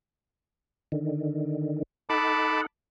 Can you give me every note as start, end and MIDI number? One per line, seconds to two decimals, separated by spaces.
0.92 1.83 50
0.92 1.83 51
2.09 2.66 63
2.09 2.66 69
2.09 2.66 78
2.09 2.61 81
2.09 2.61 83
2.09 2.61 86